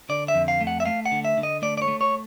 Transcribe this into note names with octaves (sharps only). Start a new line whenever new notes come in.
D3 D5
E5
F2
F5
A3
F#5
E5
A3 F5
F#5
D3
E5
D3
D#5
A3 D5
D5
C#5
A3
C#5